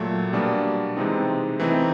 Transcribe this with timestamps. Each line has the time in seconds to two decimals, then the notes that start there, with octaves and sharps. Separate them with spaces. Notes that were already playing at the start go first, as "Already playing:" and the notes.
Already playing: A#2 F#3 A3
0.33 B2 G3 A#3 D4
0.97 C3 E3 G#3 C4 D#4
1.60 E3 A3 C4 D#4